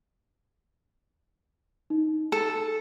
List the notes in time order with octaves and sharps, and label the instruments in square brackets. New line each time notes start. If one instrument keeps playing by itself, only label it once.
[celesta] D#4
[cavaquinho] A4 [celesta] A5